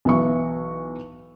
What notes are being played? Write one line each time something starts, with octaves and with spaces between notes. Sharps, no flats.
B1 E3 C#6